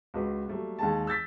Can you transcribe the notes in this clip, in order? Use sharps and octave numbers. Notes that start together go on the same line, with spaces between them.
C#2 F#4 B4
F#3 G3 A3 A#3
D#2 G#3 A5
E6 G6 A6 B6